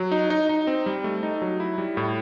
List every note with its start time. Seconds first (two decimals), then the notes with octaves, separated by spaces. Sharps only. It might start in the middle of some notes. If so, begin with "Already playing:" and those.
Already playing: F#3
0.12 D#4
0.30 D#4
0.49 D#4
0.67 C4
0.86 G3
1.04 A3
1.23 D#4
1.42 F#3
1.60 E4
1.78 G3
1.97 A2